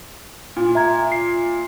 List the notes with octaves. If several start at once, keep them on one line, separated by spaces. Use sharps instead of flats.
A#2
E5 A#5 G#6
C7